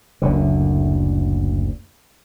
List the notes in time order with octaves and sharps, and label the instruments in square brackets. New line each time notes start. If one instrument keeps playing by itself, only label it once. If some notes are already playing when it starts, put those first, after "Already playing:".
[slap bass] F#1 D2 D3